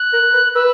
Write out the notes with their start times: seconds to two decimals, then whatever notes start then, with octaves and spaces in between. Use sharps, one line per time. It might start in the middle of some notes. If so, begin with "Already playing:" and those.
Already playing: F#6
0.13 A#4
0.33 B4
0.55 B4 E6